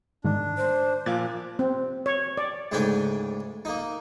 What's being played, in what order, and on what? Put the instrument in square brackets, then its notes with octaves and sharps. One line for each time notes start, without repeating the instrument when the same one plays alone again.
[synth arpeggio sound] G#2 D#3 [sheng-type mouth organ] D4
[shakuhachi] C5
[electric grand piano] A#2 F3 F5 [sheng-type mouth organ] D6 [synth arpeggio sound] F#6 G#6 A6
[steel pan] C4
C#5
D5
[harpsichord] D2 G#2 C#3 D4 G5 G#5
A#3 D#4